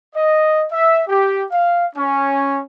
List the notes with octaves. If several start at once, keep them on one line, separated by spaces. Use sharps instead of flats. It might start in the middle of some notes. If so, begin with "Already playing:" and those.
D#5
E5
G4
F5
C#4